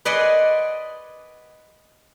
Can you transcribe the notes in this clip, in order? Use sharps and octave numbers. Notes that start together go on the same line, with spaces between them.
B4 D5 D#5 F#5 G#5 C6